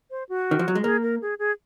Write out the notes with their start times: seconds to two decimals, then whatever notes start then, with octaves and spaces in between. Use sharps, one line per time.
0.11 C5
0.29 F#4
0.51 D#3
0.59 F3
0.68 F#3
0.75 G#3
0.84 A#3 G#4
1.02 A#4
1.22 G#4
1.39 G#4